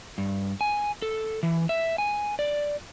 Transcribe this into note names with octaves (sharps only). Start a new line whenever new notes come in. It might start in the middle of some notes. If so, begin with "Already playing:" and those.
G2
G#5
A4
E3
E5
G#5
D5